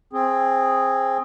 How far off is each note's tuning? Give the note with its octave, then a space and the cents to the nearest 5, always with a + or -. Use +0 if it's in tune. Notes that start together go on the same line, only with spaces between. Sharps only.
C4 +15 G#4 +0